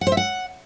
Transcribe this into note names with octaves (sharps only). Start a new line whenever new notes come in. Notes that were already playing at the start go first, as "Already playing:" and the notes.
F#5
C5
E5
F#5